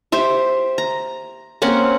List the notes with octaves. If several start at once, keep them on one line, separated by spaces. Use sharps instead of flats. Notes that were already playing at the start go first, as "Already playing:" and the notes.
G4 C5 E5
A#5
A#3 C4 C#4 F#5